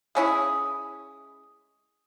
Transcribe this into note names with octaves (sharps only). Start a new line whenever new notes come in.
G#3 C#4 E4 G#4